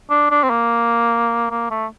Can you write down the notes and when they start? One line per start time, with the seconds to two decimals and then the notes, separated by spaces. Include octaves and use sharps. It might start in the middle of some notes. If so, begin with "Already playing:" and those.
0.10 D4
0.30 D4
0.43 C4
0.50 A#3
1.50 A#3
1.70 A3